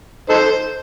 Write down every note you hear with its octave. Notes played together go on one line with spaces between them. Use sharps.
D#4 A4 C5